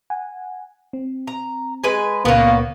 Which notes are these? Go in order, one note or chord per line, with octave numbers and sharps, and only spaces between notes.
F#5 G#5
C4
A#5
G#3 B4 G#5
C#2 A#2 C#3 A#3 B3 A#4 C#5